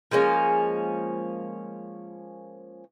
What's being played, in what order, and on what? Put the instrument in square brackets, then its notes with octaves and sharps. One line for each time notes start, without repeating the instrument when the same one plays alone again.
[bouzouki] F3 G#3 A#3 C#4